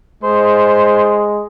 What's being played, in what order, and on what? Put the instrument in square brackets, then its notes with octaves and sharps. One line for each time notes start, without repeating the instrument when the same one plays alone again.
[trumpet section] G#3 [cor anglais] C5